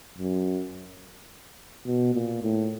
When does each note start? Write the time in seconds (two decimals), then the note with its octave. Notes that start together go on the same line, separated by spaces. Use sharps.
0.18 F#2
1.86 B2
2.14 A#2
2.42 A2